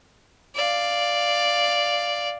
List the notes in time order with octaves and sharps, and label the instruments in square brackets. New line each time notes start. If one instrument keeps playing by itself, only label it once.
[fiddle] D5 F5